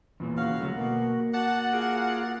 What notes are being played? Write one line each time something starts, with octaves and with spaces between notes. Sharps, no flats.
E2 A#2 E3
C#3 F#4 C#5 F5
D2 F#3 A3
B2 A#3
F#4 D5 F#5 A5 F#6
F4 G#4 A#4